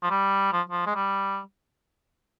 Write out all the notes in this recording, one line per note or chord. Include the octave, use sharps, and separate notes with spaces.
F3
G3
F3
F3
G#3
G3